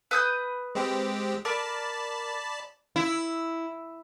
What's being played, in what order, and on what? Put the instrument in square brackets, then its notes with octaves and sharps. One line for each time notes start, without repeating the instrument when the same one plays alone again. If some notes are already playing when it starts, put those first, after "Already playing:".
[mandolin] B4 D#6 G6
[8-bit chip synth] G#3 C4 G4
[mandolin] A#4 [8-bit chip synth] D5 A5 B5
[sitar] E4